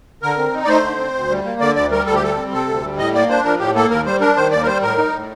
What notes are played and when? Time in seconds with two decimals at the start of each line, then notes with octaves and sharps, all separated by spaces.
0.23 D3 A#4
0.38 C4
0.53 D#4
0.64 D5
0.68 A3 C5
0.83 D3
0.99 C4
1.15 D2
1.30 G3
1.45 A#3
1.61 D3 D5
1.76 D2 D5
1.92 G3 A#4
2.06 D2 A4
2.15 G4
2.22 G3 A4
2.37 C4
2.52 C3 A4
2.69 D2
2.84 G3
2.98 A2 D#5
3.14 A#3 D5
3.29 D4 C5
3.45 F3 A#4
3.60 A2 G4
3.75 A#3 A4
3.90 D#2 A#4
4.06 G3 C5
4.21 D4 A#4
4.37 D#3 C5
4.51 D#2 D5
4.62 A#4
4.67 G3 C5
4.82 A2 A#4
4.98 D#4
5.13 A2